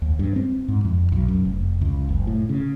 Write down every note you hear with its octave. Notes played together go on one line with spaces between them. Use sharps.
D#2
G2
C4
G#2
F2
B1
F#2
F1
C#2
F#1
A2
C#3